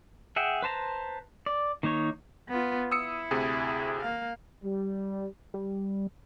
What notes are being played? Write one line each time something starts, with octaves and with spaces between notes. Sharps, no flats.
G#4 E5 F#5 G5
B4 C5 A5 A#5
D5
D#3 A#3 D#4 C#5
B3 F4
E4 D#6 E6 C#7
D2 C3 G#4
A#3 F5
G3
G3